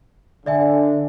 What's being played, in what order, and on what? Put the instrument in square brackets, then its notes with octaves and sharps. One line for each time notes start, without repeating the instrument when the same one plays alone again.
[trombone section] D3 [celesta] D5 E5 G#5